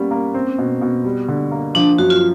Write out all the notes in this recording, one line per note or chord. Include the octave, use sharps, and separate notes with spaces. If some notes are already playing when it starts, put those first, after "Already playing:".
Already playing: G3 A#3 B3 C#4
A#3
C4
B2
B2
G3
D3
A#3
F3 D4
F#2 F#4
F4